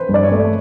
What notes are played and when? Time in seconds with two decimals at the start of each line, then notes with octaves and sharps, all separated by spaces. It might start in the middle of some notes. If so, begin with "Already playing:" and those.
Already playing: B4 C5
0.09 G2
0.14 D5
0.23 C#5
0.32 A3